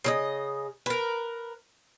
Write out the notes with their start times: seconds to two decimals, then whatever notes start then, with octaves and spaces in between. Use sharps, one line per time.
0.04 C#3 A4 D#5
0.86 A#4 B4